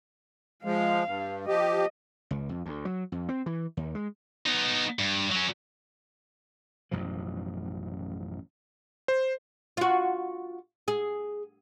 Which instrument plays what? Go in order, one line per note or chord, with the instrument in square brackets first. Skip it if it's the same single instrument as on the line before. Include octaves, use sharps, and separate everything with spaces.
[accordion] F3 G#3 [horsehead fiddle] F5
[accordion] G2
[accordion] F3 G4 [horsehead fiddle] D#5
[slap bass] C#2
F2
D2
F#3
F2
C4
E3
D#2
G#3
[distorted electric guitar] B3 D#4
G2
F#3 C#4
[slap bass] A1 F#2 B2 F3
[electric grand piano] C5
[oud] F4 F#4
G#4